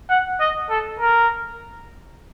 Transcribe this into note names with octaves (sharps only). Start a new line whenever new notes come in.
F#5
D#5
A4
A#4